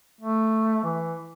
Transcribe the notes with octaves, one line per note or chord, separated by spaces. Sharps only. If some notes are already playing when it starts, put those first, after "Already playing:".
A3
E3